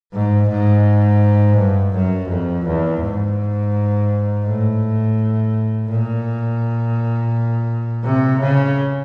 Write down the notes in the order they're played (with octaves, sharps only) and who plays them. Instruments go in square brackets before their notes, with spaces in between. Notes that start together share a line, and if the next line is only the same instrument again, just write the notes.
[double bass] G#2
G#2
G2
F#2
F2
E2
G#2
A2
A#2
C3
C#3